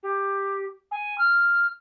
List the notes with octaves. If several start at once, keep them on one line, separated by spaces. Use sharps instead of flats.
G4
G#5
F6